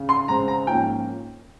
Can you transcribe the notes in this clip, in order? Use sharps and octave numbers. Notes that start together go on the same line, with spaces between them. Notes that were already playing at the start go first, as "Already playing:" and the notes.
Already playing: C#3
C6
C#3 G#3 C4 A#5
A#5
G#2 F3 A#3 C#4 G5